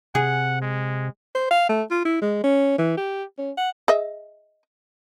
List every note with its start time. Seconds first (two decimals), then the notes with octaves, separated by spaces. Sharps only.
0.15 C3 G#4 F#5
0.62 G#3
1.35 C5
1.51 F5
1.69 A3
1.91 F4
2.05 E4
2.21 G#3
2.44 C#4
2.78 E3
2.97 G4
3.38 C#4
3.58 F#5
3.88 G#4 D#5 E5